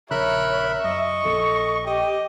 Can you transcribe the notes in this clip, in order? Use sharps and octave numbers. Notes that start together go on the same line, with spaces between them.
A#1 C#3 A#4 C#5 E5 B5 F#6
F#2 D#5 C#6
A#1 A4
G4 D#5